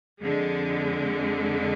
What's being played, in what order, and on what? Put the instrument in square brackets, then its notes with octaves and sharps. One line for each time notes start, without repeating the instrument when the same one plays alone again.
[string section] F2 D3 G#3